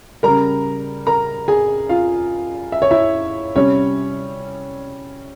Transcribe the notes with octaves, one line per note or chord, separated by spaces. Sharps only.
C#3 G3 A#4 A#5
A#4 A#5
G#4 G#5
F4 F5
E5
C#5
E4 E5
C3 G3 C#4 C#5